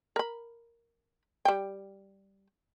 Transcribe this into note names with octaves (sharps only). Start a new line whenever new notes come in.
A#4 B5
G3 G5